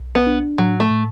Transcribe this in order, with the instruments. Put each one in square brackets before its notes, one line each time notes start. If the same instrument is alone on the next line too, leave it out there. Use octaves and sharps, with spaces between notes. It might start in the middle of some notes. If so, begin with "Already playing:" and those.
Already playing: [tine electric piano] B1
[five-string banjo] B3
[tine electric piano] D4
[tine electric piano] A2 [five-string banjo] F#3
[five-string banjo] A3
[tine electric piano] A2